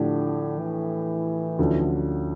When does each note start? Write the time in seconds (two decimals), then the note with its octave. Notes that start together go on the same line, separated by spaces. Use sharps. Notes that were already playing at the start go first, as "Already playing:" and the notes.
Already playing: A2 D3 F3 A3 D4 G4
0.60 E3
1.59 D2 D3 F3 C#4